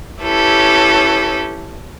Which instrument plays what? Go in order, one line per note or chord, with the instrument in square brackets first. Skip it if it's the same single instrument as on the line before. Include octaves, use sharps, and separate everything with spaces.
[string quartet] C#4 E4 G4 A4 B4